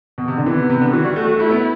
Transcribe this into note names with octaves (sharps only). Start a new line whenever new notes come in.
B2
C3
D3
E3 B3
C3
C3
D3
E3 F#4
G3
A3
A3
A3 E4
B3